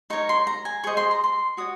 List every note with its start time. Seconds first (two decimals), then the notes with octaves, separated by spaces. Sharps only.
0.10 D#4 A#4 C#5 C#6
0.29 C6
0.47 A#5
0.65 G#5
0.84 G#4 C5 D#5 C#6
0.97 C6
1.11 A#5
1.24 C6
1.57 F#4 C#5 D#6